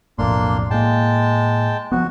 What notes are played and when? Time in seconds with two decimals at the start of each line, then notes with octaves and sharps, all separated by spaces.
0.19 B1 F2 A2 A#3 D4 C6
0.70 A2 G#3 A#3 G5 A5
1.92 F3 F#3 B3 F#4